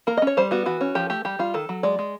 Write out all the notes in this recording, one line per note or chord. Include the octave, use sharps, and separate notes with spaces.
A#3 A#4
D#5
C#4
C#5
G3 C5
B3 F#4
E3 F#4
C#4
F3 G4
A3 G4
G3 G4
G3 F4
D#3 A4
F#3
G#3 D5
G#3